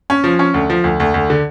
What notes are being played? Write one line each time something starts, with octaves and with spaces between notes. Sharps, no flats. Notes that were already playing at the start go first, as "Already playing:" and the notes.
C#4
F3
C#4
D2
F3
D2
D2
D2
D3